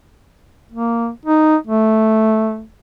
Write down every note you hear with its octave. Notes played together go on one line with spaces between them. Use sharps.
A#3
D#4
A3